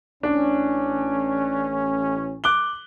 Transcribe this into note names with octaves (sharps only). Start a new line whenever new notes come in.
A1 C#4 D4
D6 F#6 G7